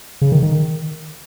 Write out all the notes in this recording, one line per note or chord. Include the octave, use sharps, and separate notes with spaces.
C#3
D#3
D#3